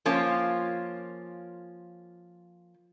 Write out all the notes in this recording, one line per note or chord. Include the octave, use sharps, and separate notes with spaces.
F3 A#3 C#4 F4